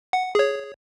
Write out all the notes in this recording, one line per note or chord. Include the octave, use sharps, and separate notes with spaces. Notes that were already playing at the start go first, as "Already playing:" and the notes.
F#5
G#4 C#5